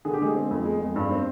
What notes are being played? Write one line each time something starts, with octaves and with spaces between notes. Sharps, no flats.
D3 G#4
G4
D3 G#3 G#4
C4
F2
G#3
F2
G2
C4